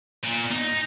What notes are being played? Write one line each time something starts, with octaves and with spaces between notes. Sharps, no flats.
A#2
D#4